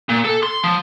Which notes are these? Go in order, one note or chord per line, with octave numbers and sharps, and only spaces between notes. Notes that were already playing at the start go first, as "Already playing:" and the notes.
A#2
A4
C6
F3